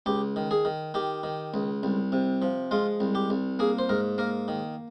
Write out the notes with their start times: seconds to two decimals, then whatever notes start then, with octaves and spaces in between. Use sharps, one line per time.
0.06 C#2 G4
0.36 D#3
0.51 G#4
0.65 D#3
0.94 D#3 G4
1.23 D#3
1.54 C#2
1.83 C2
2.12 C3
2.42 F3
2.71 G#3 F4
3.00 C2
3.15 G4
3.30 C2
3.59 A#3 G#4
3.79 C5
3.89 G#2 A#4
4.18 A#3 A#4
4.48 D#3